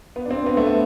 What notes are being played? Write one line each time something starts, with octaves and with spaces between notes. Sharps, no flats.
B3
D4
C4
B3
A3
B3